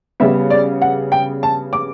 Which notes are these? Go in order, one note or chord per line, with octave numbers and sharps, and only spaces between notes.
C#3 G3 B3 E5
D5
F#5
G5
A5
D6